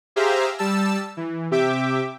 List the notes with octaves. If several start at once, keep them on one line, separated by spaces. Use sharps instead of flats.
G4 G#4 C5 E5 F5 A#5
G3 A5 E6
E3
C3 G4 E5 G5 D6